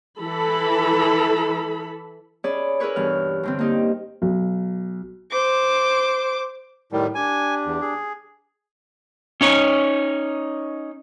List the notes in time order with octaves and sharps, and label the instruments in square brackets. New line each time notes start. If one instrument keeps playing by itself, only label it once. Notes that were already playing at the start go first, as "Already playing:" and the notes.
[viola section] E3 A4 B5
[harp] C#4 G#4 C#5 D5 B5
E4 G#4 A#4 B4 C#5
G2 B2 E3 F6
G2 D3 C4
A#3 D#4 G4
[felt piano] B1
[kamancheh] C5 D6
[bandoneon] A2 D#3 G3
[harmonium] D4 G4 [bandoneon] G#5
[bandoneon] E2
G#4
[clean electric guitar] C#4 D#4 C#5